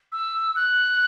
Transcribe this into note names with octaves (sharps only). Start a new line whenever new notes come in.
E6
F#6